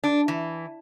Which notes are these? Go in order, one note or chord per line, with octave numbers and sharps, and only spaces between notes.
D4
E3